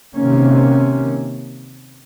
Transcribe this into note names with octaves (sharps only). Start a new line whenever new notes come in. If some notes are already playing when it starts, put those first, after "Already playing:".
C3 D#3 A#3 C#4